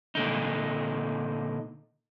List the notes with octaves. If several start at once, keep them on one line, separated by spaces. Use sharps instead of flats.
A#2 D3 D#4